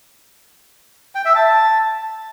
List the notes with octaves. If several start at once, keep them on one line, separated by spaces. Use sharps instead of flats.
G5
E5
A5